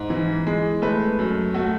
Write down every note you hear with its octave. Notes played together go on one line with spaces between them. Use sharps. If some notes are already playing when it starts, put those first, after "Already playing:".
Already playing: G#2
E3
G#3
A3 B4
F#2
A3 F#4